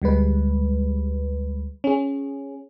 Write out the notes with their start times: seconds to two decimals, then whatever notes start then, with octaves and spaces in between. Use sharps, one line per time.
0.02 D2 G3 G#3 B4
1.84 C#4 G#4